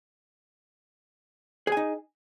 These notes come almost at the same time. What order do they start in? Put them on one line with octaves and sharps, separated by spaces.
G#4 G#5 D#4